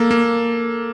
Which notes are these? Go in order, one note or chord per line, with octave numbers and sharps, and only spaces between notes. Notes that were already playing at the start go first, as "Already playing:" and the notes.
Already playing: A#3 A4
A#3